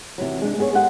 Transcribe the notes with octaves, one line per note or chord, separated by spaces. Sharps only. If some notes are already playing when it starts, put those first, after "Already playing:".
C3 E3 F#3
G#3 D4
B3 G#4 C#5
G#3 G4 A4 F#5